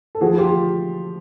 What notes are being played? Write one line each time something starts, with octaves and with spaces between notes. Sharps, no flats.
A4
F3 F#4 G#4
F4 G4